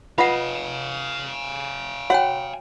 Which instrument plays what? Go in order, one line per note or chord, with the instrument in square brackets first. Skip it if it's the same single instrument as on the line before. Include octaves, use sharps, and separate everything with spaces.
[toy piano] F4 F#5 [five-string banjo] B4 D#5 [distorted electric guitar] F5 G#5
[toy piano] F#4 C#5 G5 [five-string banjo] F#5